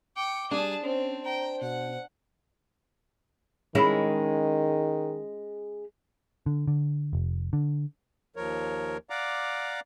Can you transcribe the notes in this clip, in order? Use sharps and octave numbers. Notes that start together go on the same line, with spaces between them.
G5 D6 C#7
G3 D4 G#4 A5
C4 C#4 C5
G5 A#5
B2 F#5
D#3 G#3 C#4 E4
D3
D3
F1
D3
D#2 F3 A#4 C#5
D5 F5 F#5 A#5 D6